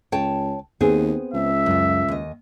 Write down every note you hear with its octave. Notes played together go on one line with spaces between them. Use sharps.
C#2 C#5 G5 A5
D#2 B3 C4 G#4
C#2 E5
F#2 F4
D#2 D#5